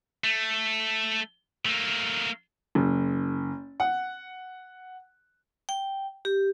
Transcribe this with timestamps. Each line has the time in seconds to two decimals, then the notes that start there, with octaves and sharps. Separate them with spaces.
0.24 A3
1.66 A3 A#3
2.75 F#1
3.80 F#5
5.69 G5
6.25 G4